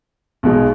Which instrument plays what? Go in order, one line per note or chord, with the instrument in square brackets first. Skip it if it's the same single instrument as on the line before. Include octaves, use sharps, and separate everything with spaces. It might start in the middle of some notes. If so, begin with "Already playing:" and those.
[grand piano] B1 B2 G#3